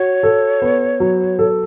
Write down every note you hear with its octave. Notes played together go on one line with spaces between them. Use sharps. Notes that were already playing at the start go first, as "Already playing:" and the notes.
Already playing: F#4 C#5
A4
B3
F#3
A4